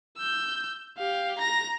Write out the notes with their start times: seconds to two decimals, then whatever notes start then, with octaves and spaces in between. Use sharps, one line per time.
0.18 E6 G6
0.98 G4 F5
1.39 A#5 A#6